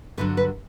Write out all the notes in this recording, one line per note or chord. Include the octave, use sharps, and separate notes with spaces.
G2 D3 F#3 B4
B4